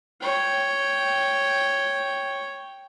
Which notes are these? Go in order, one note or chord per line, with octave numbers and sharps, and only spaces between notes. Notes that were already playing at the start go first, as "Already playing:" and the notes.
C#5 G5